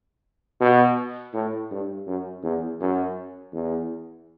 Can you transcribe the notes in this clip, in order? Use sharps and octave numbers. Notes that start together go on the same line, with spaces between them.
B2
A2
G2
F#2
E2
F#2
E2